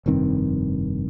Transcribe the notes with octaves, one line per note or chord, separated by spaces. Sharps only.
F1 G2 D#3 C4